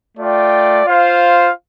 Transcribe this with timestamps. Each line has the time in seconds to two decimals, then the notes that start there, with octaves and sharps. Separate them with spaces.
0.16 A3 F4 D5 G5
0.85 F4 C5 F5